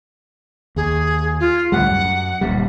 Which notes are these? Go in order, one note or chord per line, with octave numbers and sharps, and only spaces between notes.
D#2 G#4
F4
D2 A2 G3 F#5
F#2
D1 A#2 G3